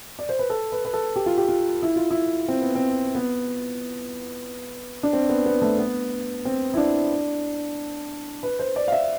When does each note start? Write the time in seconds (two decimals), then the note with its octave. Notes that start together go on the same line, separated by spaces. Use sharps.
0.19 D5
0.29 C5
0.39 B4
0.50 A4
0.72 B4
0.85 B4
0.93 A4
1.16 G4
1.26 F4
1.37 G4
1.49 F4
1.82 E4
1.96 F4
2.11 E4
2.48 C4
2.62 B3
2.75 C4
3.15 B3
5.03 D4
5.13 C4
5.29 B3
5.46 B3
5.62 A3
5.78 B3
6.45 C4
6.74 E4
6.77 D4
8.43 B4
8.59 C5
8.76 D5
8.88 F5
8.92 E5